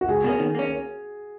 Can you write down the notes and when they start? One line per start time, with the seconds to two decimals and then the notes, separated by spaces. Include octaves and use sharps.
0.01 F#4
0.08 C#2 G#4
0.24 B2 A#3 C#4
0.39 D#3
0.55 A#3 C#4